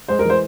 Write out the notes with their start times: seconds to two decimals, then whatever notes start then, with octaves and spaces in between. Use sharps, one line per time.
0.08 G#3 C5
0.19 A#4
0.25 E3 C5